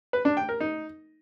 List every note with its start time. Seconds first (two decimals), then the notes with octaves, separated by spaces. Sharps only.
0.13 B4
0.25 D4
0.37 G5
0.49 A#4
0.60 D#4